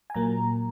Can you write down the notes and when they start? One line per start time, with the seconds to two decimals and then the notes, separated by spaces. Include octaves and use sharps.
0.10 G#5
0.15 A#2 F#3 A#3 A#5